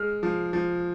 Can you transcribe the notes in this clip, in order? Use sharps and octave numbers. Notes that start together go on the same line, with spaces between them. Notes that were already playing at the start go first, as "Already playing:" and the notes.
Already playing: G#3 F6
F3
F3